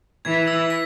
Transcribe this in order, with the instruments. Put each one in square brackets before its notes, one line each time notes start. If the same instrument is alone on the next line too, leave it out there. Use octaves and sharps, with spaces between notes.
[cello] E3 [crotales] G#6
[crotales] E6
B6